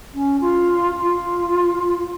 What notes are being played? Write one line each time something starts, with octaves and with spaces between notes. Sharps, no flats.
C#4
F4
F4